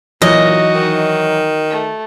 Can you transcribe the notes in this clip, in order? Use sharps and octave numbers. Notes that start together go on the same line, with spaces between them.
A#2 E3 F#3 D#4 F#4 D#5
D#3
A3